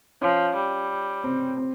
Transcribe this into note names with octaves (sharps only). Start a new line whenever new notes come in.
F3 C#4
G3
C4
C4